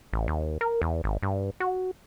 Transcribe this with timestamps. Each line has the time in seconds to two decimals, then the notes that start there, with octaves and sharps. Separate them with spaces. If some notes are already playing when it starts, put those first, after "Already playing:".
0.13 A1
0.28 D#2
0.61 A#4
0.82 E2
1.04 G#1
1.23 G2
1.60 F#4